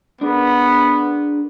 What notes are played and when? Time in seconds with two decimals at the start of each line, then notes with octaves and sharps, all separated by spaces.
0.21 B3 D4 G#4 A#4